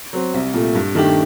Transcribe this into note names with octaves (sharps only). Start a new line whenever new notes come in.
F#3 C4
C2
A#2 A3
G2
D#3 A3 D4 G4